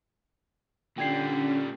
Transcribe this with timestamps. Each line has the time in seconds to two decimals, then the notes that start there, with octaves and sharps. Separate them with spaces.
0.98 A#2 D3 G3 C#4 G5 G#6 C7